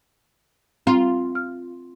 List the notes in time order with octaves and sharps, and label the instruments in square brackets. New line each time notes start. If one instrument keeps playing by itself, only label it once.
[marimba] C4 [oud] F4
[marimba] F6